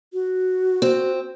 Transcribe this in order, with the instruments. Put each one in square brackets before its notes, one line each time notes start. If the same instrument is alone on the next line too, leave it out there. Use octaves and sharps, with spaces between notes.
[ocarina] F#4
[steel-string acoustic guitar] C4